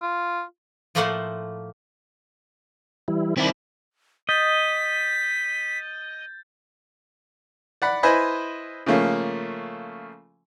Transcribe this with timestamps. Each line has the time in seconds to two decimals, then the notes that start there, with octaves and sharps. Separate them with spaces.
0.02 F4
0.95 A2 F3 A3 A#3 C5 F#5
3.08 E3 G3 E4
3.37 D#3 C4 E4 D5 B5
4.29 D#5 G6 A6 B6
7.82 D5 F#5 B5
8.03 E4 B4 C5 D#5 G#5 B5
8.86 C#3 F3 A3 A#3 C#4